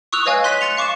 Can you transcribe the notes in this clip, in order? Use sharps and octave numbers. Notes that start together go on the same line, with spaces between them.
C#6 D#6 E6 F#6 F7
B4 C#5 D#5 F5 G#5
C6 F#6 B6 D#7
F#6 A6 C#7 F7
F5 C#6 D6 C#7 E7